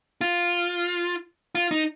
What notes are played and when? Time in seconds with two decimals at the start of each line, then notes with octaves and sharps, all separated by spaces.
0.21 F4
1.55 F4
1.71 D#4